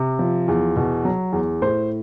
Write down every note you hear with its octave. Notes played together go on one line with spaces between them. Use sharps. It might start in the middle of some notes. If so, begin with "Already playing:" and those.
Already playing: C3
F3
E2
B2
F#3
E2
A2 C5